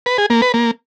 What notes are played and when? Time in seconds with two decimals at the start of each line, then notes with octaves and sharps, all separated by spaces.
0.06 B4
0.18 G#4
0.30 A#3
0.42 B4
0.54 A#3